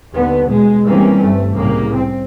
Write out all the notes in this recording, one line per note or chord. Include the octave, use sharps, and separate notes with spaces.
D#2 D3 B3
B2 G#3
D#3 E3 G3 A#3 C4 C#4
G1 A3
C2 A2 C#3 A#3
C4